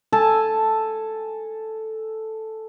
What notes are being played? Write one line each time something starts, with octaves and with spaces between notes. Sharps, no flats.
A4 G#5 A5